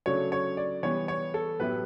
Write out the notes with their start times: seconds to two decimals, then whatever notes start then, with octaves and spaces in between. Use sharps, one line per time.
0.06 C#3 F#3 A3 D4 F#4 C#5
0.32 C#5
0.57 D5
0.83 E3 G3 B3 C#5
1.08 C#5
1.34 A4
1.59 A2 F#3 B3 E4 G4 B4